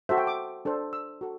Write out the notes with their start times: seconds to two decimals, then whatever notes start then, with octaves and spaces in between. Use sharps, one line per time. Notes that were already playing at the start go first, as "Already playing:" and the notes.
0.09 F#4 A4 C5 E5
0.18 G5
0.27 D6
0.65 D4 A4 C5
0.93 E6
1.21 F#4 A4